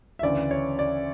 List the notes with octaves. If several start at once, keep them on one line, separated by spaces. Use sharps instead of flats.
E5
D2 C#3 E3 D5
C#5
D5